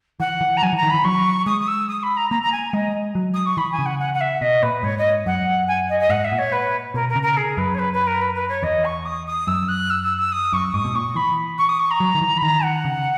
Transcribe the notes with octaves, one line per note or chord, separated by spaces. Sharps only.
E3 F#5
E3
A#5
F#3 G#5
E3 A#5
D#3
E3 B5
F#3 C#6
G#3 D#6
D#6
E6
D#6
B5
A#5
A#3 A#5
A#5
G#5
G#3 D#5
F#3
D#6
C#6
E3 B5
G#5
C#3
F#5
F#5
F#5
E5
B2 D#5
A#2 B4
G#2 C#5
D#5
F#2 F#5
G#5
D#5
D#5
G#2 F#5
E5
A#2
C#5
B4
B2 A#4
A#4
C#3
A#4
G#4
F#2 B4
C#5
B4
B4
A#4
B4
B4
C#5
E2 D#5
C#6
D#6
D#6
F#2 E6
F#6
E6
E6
E6
D#6
F#2 C#6
G#2 D#6
B2
A#2 C#6
E3 B5
C#6
D#6
C#6
A#5
F#3
D#3
E3
B5
D#3 A#5
F#5
C#3